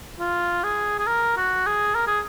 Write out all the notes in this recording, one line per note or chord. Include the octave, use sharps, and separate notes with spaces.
F4
G#4
G#4
A#4
F#4
G#4
A#4
G#4